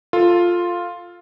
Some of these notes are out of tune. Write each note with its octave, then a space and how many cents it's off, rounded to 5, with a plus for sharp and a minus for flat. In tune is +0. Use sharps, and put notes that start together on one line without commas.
F4 +5 A4 +10